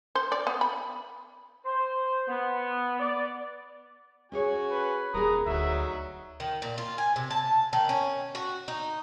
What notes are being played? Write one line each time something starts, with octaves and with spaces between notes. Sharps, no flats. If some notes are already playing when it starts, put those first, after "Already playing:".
C5
D5
B3
B5
C5
B3
D5
C#4 F#4 G#4 C#5 G#5
B4
D#1 G#4 A#4 A#5 B5 D#6
D2 F#3 D#4 F#4 E5
D#3
A#2
F4
G#5
C3
A5
D#3
C#4
F#4
D#4